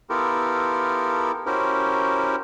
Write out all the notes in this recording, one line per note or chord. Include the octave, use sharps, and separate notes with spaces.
B3 E4 F4 G4 A4 A#4
C#4 E4 F#4 G4 A#4 C5